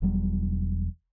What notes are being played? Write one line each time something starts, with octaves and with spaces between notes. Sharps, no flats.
E1 E2 F#3 G3